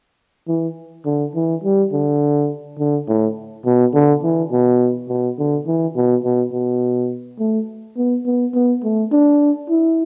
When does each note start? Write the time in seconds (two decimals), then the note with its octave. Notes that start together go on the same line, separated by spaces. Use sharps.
0.48 E3
1.06 D3
1.35 E3
1.63 G3
1.92 D3
2.79 D3
3.08 A2
3.65 B2
3.93 D3
4.23 E3
4.52 B2
5.09 B2
5.38 D3
5.66 E3
5.96 B2
6.24 B2
6.53 B2
7.39 A3
7.97 B3
8.26 B3
8.54 B3
8.84 A3
9.12 D4
9.70 E4